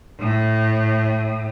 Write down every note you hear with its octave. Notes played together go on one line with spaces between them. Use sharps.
A2